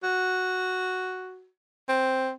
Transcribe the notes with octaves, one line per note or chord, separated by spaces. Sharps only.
F#4
C4